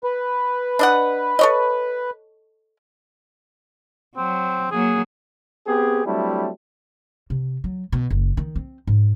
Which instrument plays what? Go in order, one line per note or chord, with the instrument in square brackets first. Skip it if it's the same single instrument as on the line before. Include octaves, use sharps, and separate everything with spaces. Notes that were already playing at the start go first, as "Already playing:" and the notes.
[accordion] B4
[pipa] D4 D#5 F#5
A4 C#5 D#5
[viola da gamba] F#3 [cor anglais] C4
[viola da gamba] F#3 A#3 [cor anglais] G#4
[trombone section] B3 C4 G4 G#4
F#3 G3 A3 C4 D4 E4
[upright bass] C3
F#3
B2
F#1
D#3
C4
G#2